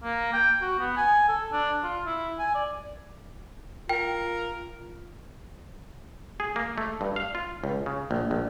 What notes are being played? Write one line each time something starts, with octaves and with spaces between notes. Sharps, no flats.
A#3
G5
F#4
B3
G#5
A4
D4
F4
E4
G#5
D5
F4 A#4 G5
G#4
A#3
A3
G2
F5
F4
C#2
C#3
A#1
A#1